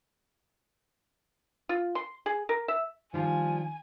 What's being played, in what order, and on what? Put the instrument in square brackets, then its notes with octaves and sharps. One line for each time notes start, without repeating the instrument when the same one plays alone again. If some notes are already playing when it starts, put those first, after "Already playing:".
[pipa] F4
C6
G#4
A#4
E5
[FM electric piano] D#3 [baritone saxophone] F3 [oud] G3 D4 F4 [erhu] G#5